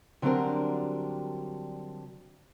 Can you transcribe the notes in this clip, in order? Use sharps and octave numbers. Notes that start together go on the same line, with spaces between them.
D3 F#3 G3 C4 D4 A#4